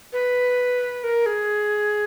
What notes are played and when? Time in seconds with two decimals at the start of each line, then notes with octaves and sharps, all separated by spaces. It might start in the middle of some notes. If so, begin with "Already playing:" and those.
0.13 B4
1.04 A#4
1.26 G#4